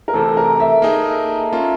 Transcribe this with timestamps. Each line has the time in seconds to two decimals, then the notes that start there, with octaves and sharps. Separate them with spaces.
0.08 A#4
0.13 C3 E3 A3 C4 A4
0.37 A#4
0.60 E5
0.82 A#3 D#4 G#4
1.52 A#3 C#4 F4